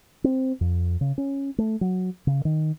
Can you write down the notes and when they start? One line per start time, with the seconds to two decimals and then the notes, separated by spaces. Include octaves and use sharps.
0.24 C4
0.61 F2
1.01 C#3
1.18 C#4
1.58 A3
1.81 F#3
2.27 C#3
2.45 D#3